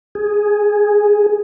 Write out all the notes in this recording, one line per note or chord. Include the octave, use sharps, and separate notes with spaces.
G#4